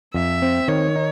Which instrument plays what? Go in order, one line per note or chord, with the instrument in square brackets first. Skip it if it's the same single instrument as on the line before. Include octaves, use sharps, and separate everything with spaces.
[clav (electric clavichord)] F2 [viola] E5
[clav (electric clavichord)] C4
[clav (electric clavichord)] D#3 [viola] C#5
[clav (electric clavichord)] D#4